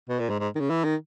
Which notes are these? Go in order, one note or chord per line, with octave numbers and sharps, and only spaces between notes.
B2
A#2
G#2
G#2
D#3
C#3
E3
D#3